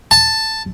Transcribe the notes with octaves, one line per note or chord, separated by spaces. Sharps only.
A5